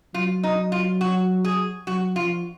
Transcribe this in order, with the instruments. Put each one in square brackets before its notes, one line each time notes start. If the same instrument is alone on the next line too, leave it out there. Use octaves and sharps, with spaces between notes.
[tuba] F#3 [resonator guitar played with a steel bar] F4
[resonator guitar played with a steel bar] D#4
F4
F#4
G#4
[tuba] F#3 [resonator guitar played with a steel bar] F#4
[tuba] F3 [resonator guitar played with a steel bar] F4